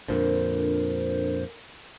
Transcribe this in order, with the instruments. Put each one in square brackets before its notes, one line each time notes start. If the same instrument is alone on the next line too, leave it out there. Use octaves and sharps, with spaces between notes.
[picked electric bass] F2 A#2 D3 [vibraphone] D4 A4 A#4 [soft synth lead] C5